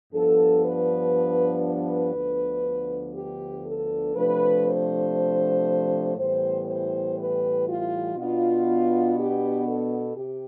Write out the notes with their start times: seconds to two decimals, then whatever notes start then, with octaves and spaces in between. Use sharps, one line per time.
0.13 G2 F3 B3 D4 A4
0.63 B4
1.65 B4
2.14 D2 D3 F3 B3 D4
3.14 G4
3.65 A4
4.15 C3 F3 A3 D4 B4
4.65 C5
6.16 A2 E3 G3 B3 C5
6.66 C5
7.16 B4
7.65 F4
8.16 B2 B3 D4 F4
9.17 G4
9.67 A4
10.16 C3 G4